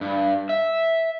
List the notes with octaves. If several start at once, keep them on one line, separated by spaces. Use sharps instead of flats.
G2
E5